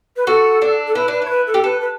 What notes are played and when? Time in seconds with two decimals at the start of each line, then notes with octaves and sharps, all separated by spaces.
0.16 B4
0.27 F#4 A4
0.62 D4
0.87 A4
0.95 E4 B4
1.08 D4 B4
1.22 E4 C#5
1.30 B4
1.47 A4
1.54 G4
1.64 A4 B4
1.81 B4